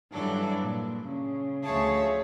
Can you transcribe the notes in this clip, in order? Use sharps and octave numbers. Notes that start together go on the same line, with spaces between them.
G2 E3 F#3 D4 A4
A#2
C#3
D2 F3 G#4 C#5 E5 A5